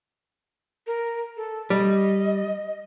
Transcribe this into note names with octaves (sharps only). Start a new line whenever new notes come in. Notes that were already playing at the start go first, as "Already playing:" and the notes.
A#4
A4
G3 D#5